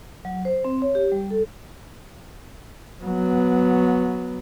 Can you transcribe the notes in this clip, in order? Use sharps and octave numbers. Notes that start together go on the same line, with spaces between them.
F#3
C5
C4
C#5
G4
G3
A4
F#3 B3